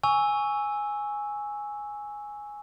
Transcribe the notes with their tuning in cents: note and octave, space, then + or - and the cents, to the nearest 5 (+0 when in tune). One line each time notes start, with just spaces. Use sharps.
G#5 +0 C#6 +10 E6 -10